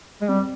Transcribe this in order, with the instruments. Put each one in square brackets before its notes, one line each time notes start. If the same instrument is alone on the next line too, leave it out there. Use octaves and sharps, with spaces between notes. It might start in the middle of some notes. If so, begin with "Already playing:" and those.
[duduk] G#3
[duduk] G3 [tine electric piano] C4